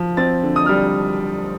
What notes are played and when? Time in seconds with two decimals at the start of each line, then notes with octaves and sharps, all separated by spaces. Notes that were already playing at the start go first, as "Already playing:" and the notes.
Already playing: F3
0.17 C4 A6
0.43 D3
0.56 D#6
0.66 G3 F6